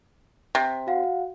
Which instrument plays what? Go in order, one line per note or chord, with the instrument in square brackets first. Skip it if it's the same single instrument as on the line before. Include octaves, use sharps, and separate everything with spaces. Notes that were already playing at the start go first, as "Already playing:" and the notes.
[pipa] C3
[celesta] F#4 F5 F#5